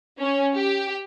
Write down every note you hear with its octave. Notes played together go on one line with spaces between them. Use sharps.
C#4
G4